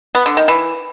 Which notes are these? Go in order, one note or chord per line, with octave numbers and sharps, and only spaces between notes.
B3
D3
D#3
E3